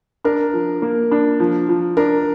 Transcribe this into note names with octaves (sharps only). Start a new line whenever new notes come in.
D4 A#4
F3
A#3
D4
F3
F3
D4 A#4